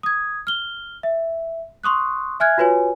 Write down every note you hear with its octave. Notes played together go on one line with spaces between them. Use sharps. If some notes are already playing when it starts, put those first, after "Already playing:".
D#6 G#6
F6 G7
E5
C6 C#6 D#6 F#6
E5 G#5 F6 F#6 G#6
F4 F#4 B4 C#5 G#5